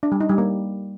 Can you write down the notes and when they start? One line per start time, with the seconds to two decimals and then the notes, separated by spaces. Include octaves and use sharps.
0.03 D4
0.12 G3
0.20 D#4
0.29 G3
0.38 A#3